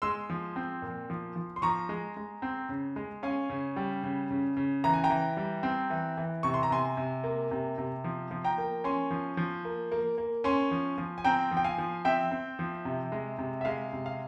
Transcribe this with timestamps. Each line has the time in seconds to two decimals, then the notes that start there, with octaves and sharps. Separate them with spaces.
0.02 G#3 C6 E6
0.30 F3
0.56 C4
0.82 A#2
1.10 F3
1.36 F3
1.56 C6
1.62 F3 A#5 C#6
1.89 G#3
2.17 G#3
2.42 C4
2.69 C#3
2.96 G#3
3.23 C#4 F5 G#5
3.50 C#3
3.76 G3
4.03 C#3
4.31 C#3
4.57 C#3
4.84 E3 A#5
4.94 G#5
5.04 G5 A#5
5.10 E3
5.37 G3
5.63 C4
5.90 E3
6.17 E3
6.43 C3 C#6
6.54 C6
6.63 A#5
6.70 C3 G#5 C6
6.97 C3
7.24 A#3
7.51 C3
7.78 C3
8.04 F3
8.31 F3
8.44 G5 A#5
8.58 A#3
8.84 C#4 G#5 C6
9.11 F3
9.37 F3
9.65 A#3
9.91 A#3
10.18 A#3
10.44 C#4 G#5 C6
10.71 F3
10.98 F3
11.18 G#5
11.24 C4 G5 A#5
11.51 F3
11.57 G5
11.64 F5 G#5
11.78 F3
12.05 C4 E5 G5
12.31 C4
12.59 F3
12.85 C3
13.12 G#3
13.38 C3
13.61 E5
13.65 G#3 F5
13.93 C3
14.06 F5